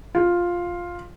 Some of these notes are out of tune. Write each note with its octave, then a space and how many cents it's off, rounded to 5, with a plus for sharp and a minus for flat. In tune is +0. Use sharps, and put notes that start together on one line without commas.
F4 +5